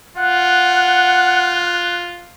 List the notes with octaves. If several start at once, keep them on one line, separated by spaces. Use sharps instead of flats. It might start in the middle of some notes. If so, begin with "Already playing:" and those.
F4 F#5 F#6